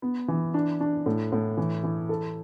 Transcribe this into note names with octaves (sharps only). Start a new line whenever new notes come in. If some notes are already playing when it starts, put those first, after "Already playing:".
B3
E3
D4
D4
A2
A2
E3
E3
A4